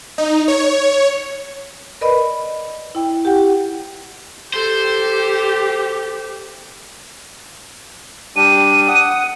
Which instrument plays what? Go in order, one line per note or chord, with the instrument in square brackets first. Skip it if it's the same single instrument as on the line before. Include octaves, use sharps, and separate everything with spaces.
[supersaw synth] D#4
C#5
[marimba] A#4 B4 D5 D#5 B5
E4 G5
G4 F#5 G5
[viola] G4 [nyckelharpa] A4 [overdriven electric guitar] C5
[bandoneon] G3 D4 G4 [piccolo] D#7
[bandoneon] F#5 D#6